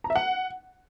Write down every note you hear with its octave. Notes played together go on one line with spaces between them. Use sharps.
A#5
E5
F#5